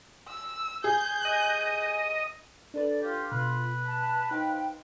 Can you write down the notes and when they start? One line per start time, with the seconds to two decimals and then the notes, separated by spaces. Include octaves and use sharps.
0.28 E6
0.84 G#4 G6
1.25 D#5
2.74 D4 A4 B4 D5
3.02 F4 G4
3.32 B2 B4
3.86 A5
4.31 D#4 C5 F5 G5